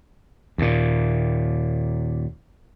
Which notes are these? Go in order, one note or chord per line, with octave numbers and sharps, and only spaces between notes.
D#2 A#2